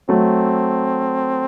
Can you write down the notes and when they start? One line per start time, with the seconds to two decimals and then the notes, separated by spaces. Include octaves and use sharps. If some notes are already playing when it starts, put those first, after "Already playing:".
0.09 F#3 A3 C4